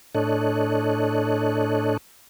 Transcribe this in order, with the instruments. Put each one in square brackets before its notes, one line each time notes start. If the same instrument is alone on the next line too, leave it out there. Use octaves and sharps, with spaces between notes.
[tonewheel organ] A2 D4 A4 C#5 D#5 F#6